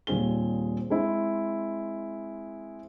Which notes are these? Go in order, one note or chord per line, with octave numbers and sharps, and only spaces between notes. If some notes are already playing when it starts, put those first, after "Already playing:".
D#2 A#2 G3 C4 G#4 G7
G#3 C4 E4